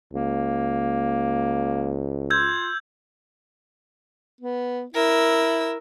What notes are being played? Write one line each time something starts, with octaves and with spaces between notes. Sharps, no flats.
C#2 A#3
F4 E6 G6 G#6
B3
E4 A#4 E6